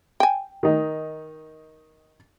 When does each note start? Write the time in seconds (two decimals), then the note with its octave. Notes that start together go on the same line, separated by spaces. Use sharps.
0.20 G5 G#5
0.63 D#3 D#4